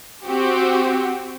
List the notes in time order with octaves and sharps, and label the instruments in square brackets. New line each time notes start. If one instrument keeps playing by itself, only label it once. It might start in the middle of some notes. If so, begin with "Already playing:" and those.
[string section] C4 F#4 G4